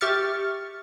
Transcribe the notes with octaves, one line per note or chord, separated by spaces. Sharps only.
G4 E5 C#6 F6 A6 C#7